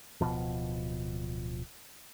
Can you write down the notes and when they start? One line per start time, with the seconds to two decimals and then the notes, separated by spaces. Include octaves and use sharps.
0.21 D1 C#2 B2 F3